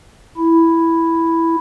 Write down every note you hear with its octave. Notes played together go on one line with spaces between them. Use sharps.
E4